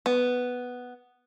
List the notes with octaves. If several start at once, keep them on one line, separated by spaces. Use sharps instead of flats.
B3